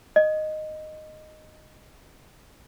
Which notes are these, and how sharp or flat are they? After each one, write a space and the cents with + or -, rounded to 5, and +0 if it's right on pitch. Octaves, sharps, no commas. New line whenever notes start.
D#5 -10